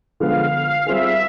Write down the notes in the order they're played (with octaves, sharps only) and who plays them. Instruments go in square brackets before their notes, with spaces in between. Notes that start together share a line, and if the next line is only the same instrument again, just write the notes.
[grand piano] D3 F3 G#3 B3 [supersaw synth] F5
[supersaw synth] F5
[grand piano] G3 C4 F4 G#4 [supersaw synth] E5